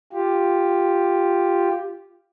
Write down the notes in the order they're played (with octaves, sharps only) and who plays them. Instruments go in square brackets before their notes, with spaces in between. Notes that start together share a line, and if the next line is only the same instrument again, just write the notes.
[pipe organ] F4 G4